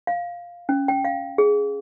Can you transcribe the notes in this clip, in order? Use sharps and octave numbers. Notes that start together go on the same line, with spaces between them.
F5
C#4
G5
F5
G#4